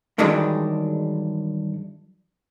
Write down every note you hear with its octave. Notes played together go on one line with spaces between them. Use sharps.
G2 D#3 E3 F#3 G#3 D4